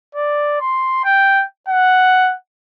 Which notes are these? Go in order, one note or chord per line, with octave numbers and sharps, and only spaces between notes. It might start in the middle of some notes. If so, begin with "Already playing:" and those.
D5
C6
G5
F#5